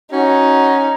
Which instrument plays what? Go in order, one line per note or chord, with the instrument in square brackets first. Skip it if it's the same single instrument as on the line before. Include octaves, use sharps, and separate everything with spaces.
[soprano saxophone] C#4 [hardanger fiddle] D#4 [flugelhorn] F#4